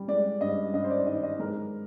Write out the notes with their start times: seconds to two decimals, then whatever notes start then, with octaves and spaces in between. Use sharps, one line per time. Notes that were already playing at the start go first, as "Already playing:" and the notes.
Already playing: G3
0.08 G#3 D5
0.41 G2 D#5
0.74 G2 D#5
0.84 C5
0.90 D5
1.07 D#3 D#5
1.23 D#5
1.39 G#3 A#4